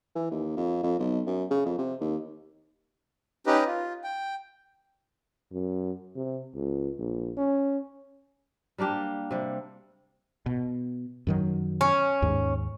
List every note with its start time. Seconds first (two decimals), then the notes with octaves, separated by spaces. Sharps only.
0.15 E3
0.31 D#2
0.56 F2
0.83 F2
0.99 B1
1.27 F#2
1.50 C#3
1.65 F2
1.78 C3
2.01 D#2
3.47 C#4 D#4 G4 B4 D#5
3.66 F4
4.04 G5
5.52 F#2
6.16 C3
6.55 C#2
6.99 A#1
7.37 C#4
8.78 G3 A#3 D4 G4
9.31 C3 G3
10.46 B2
11.27 F#2 D#3 F#3
11.81 C#4
12.22 D#2 G#2